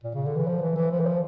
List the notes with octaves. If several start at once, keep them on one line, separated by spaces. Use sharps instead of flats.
A#2
C#3
D3
E3
F3
E3
E3
F3
E3
F3